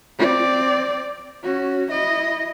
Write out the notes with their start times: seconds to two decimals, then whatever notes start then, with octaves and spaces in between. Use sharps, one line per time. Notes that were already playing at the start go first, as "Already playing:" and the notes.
0.19 C4 D5
1.43 C#4 F#4
1.91 E4 D#5